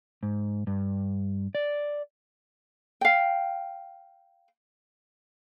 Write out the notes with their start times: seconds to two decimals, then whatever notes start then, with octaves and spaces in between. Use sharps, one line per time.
0.23 G#2
0.67 G2
1.55 D5
3.01 F5 G5